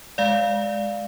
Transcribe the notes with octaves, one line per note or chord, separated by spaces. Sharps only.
G#3 D5 F5